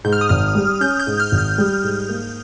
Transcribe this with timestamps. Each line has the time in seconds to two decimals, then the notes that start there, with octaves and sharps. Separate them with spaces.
0.04 G#2 G6
0.13 F6
0.21 D#6
0.29 G#1 F6
0.55 G3
0.81 C#4 G6
1.00 G6
1.07 G#2
1.20 F6
1.32 G#1
1.38 F6
1.58 G3
1.83 G#2
2.09 A#3